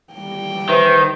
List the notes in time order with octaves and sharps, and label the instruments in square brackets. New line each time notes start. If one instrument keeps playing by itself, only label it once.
[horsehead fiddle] G3 G5
[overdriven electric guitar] D#3 [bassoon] E3 [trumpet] C5